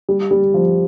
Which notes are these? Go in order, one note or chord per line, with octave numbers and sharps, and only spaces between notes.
G3
G3
F3